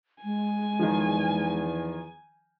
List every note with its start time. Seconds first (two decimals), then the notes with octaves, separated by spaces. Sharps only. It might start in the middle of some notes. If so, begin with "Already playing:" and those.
0.24 G#3 G#5
0.79 E2 D#3 F3